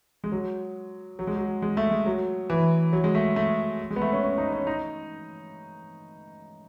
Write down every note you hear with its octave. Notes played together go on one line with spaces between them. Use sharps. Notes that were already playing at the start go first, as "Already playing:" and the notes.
G#3
F#3
F#3
G#3
F#3
G#3
A3
G#3
F#3
E3
F#3
G#3
A3
A3
G#3
B3
A3
C#4
C#4
D#4
C#4
D#4